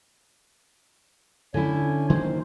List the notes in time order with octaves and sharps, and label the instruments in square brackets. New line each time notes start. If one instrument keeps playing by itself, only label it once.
[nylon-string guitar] D3 E4 [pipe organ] C#4 G#5
[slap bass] D#3 F#3 A#3 [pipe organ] C5